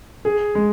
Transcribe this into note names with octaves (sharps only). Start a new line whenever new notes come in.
G#4
G#3